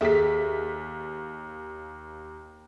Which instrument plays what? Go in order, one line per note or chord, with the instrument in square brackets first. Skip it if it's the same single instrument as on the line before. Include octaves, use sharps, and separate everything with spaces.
[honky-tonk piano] D#2 B6 [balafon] G#4 A4 E5